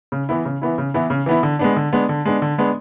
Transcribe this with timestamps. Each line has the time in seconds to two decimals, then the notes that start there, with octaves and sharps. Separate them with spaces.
0.12 C#3
0.29 E3 B3 E4
0.45 C#3
0.62 E3 B3 E4
0.78 C#3
0.94 E3 B3 E4
1.10 C#3
1.26 E3 B3 E4
1.43 D3
1.59 G#3 B3 D4
1.76 D3
1.93 G#3 B3 D4
2.09 D3
2.25 G#3 B3 D4
2.42 D3
2.58 G#3 B3 D4